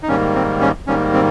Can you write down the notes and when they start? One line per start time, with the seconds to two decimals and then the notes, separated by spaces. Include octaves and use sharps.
0.03 D#4
0.08 G#2 D#3 G3 A#3 C#4
0.35 C4
0.61 C#4
0.87 G#2 D#3 G3 A#3 C#4
1.13 C4